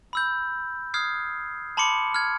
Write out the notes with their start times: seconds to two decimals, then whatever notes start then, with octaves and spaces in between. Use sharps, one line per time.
0.13 B5 E6 G6
0.94 D#6 F6 G#6 C7
1.77 A5 B5 C6 D6 C#7
2.14 F6 G#6